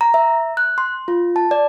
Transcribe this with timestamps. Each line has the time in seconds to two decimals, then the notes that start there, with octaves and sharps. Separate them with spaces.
0.01 A#5
0.14 E5
0.57 F#6
0.78 C6
1.08 F4
1.36 A5
1.51 D5